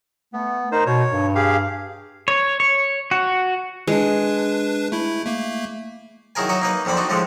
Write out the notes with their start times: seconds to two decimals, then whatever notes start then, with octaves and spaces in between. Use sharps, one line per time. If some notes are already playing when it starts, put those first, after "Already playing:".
0.33 A3 B3
0.72 D#4 A#4 C5
0.86 B2 C#5
1.12 G2
1.35 G4 G#4 F5
2.28 C#5
2.60 C#5
3.11 F#4
3.87 G#3 D4 B4
4.92 A3 E4
5.25 A3 A#3
6.35 D#3 F#3 E4 G#4 A#4 G#5
6.49 F#3 D#4 F#4 C#5 E5
6.62 A#3 D#4 B4
6.85 F2 A#2 D3 C4 B5
6.97 D4 D#4 F#4
7.09 A2 D3 F3 G#3 A3